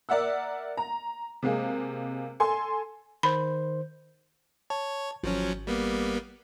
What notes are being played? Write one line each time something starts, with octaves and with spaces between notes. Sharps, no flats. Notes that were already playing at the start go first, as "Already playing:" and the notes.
A#4 D5 E5 F#5 E6
A#5
C3 G#3 A#3 G#4
A4 G#5 C6
D#3 C5 B5
C#5 A5
G#1 F3 F#3 C#4
G3 A#3 B3